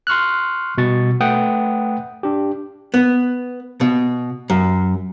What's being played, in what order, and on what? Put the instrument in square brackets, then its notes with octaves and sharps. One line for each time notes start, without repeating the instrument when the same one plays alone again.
[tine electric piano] C6 C#6 F6 F#6
B2 G3 C#6 A6
A3 B4 F#5 G5 D#6
D4 G4
[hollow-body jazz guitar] B3
B2
F#2